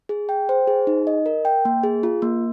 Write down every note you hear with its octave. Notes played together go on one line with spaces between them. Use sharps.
G#4
G5
C5
G#4
D#4
D#5
A#4
G5
A#3
G#4
F4
A#3